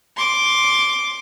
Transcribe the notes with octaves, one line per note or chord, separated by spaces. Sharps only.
C6 D6